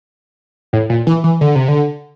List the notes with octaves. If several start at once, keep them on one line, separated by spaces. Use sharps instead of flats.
A2
A#2
E3
E3
D3
C3
D3